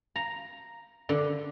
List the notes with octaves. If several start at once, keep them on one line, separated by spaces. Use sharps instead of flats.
A#5
D3